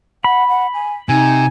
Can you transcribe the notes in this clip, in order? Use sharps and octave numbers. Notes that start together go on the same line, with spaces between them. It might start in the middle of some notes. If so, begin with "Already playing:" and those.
F#5 B5
F#5
G#5
C3 D#4 G#5